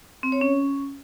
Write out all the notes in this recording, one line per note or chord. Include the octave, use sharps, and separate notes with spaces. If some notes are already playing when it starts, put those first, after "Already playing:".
C4
C#5
C#4